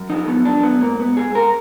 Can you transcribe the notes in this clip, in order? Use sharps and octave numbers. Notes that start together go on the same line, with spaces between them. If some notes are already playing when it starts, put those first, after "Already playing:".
Already playing: F#2
F3 D#4
B3
F#2
D4
F#2
B3
G#2 A#3
B3
G#2
G#4
G#2
A#4